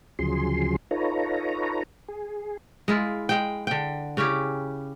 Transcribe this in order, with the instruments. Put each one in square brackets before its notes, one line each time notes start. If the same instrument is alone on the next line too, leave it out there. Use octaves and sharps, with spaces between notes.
[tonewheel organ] D2 C#3 F3 F#3 G#4 C6
D#4 F4 A4 B4 C#5 A#5
G#4
[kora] G#3 E4 F4
G#3 G5
D3 G5
C#3 C#4 E4 G4